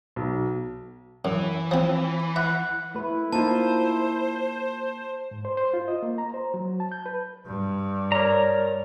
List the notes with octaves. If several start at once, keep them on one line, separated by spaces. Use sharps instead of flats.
B1
F#2 E3
F3 C4
E5 F#5
A3 E4 B4
A#3 D#4 F4 C5 A5
G#2
C5
C5
F4
D#5
A#3
A#5
C5
F#3
A5
G6
B4
G2
A#4 C#5 D5 A#5